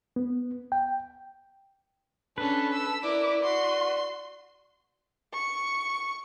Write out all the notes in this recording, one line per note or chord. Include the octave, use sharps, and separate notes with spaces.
B3
G5
C#4 D4 A4 B4
E6
E4 A#4 D5 D6
F#4 C6
C#6